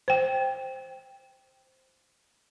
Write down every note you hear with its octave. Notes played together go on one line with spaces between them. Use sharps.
C5 G5